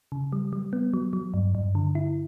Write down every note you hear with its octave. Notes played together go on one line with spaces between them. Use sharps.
C#3
G3
G3
B3
F#3
F#3
G2
G2
D3
E4